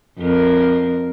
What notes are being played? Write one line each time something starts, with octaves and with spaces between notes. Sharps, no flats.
F2 C4 A#4